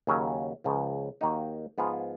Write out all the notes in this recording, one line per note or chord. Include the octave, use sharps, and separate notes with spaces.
D#2 C#3 F#3 C#4
C#2 C#3 F3
D#2 D#3 A#3 D#4 F#4
G#2 F3 B3 F4 G#4